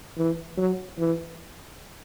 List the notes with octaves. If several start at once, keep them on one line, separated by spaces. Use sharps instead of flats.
E3
F#3
E3